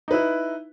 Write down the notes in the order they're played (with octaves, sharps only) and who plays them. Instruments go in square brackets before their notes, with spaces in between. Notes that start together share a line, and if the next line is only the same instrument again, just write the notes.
[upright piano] D#4
B4
E4